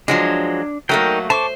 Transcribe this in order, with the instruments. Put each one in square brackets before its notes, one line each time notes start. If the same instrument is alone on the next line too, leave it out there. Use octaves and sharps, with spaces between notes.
[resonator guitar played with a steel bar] F3 F#3 G#3 [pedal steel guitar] D4
[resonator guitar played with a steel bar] F#3 A3 A#3 [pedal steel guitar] D#4 A#4 G5
[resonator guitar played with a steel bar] C5 [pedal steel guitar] A5 C#6 D6